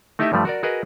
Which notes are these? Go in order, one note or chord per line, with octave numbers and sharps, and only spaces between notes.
A3 D#4 E4 G4 D#5 E5
G2 F3 G3 A3
F#4 A#4 D5
F#4 G#4 A#4 B4 D#5